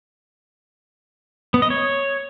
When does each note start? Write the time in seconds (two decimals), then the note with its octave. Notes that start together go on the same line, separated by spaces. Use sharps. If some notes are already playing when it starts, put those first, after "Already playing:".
1.54 B3
1.62 D#5
1.70 C#5